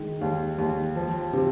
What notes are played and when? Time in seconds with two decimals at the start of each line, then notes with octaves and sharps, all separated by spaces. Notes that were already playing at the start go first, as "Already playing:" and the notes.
Already playing: D#3 G#3
0.21 D#2
0.58 D#2
0.96 F3
1.33 C3